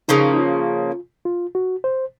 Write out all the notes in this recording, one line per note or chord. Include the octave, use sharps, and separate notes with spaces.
C#3 F3 A#3 D#4
D#4
F4
F4
F#4
C5